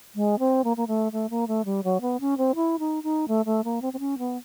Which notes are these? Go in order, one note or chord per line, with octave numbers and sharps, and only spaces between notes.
G#3
C4
A#3
A#3
A3
A3
A#3
A3
G3
F#3
B3
C#4
C4
E4
D#4
D#4
A3
A3
A#3
C4
C4
C#4
B3